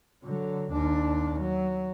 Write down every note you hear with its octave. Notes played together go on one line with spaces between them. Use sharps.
D3 F#3
D#2 D4
F#3